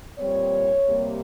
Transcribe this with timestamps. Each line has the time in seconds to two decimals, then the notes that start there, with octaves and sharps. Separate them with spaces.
0.19 A#2 G3 C4 C#5
0.88 C3 G3 A#3